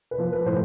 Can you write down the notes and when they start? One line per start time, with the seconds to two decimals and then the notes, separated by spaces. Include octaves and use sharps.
0.11 B4
0.18 F3
0.33 B4
0.46 A2 C5